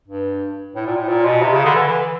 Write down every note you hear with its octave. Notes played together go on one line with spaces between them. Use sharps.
G2
A2
A#2
A2
A#2
B2
C3
C#3
D3
E3
E3